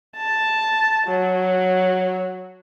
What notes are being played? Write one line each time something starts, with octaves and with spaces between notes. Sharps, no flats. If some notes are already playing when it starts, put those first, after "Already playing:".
A5
F#3